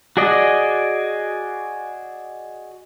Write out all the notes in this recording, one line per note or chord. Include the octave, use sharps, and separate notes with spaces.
F#4 G#4 D5 D#5